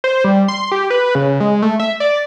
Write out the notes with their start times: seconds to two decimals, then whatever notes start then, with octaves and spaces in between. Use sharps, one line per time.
0.04 C5
0.24 G3
0.48 C6
0.72 G4
0.90 B4
1.15 C#3
1.40 G#3
1.62 A3
1.80 E5
2.00 D5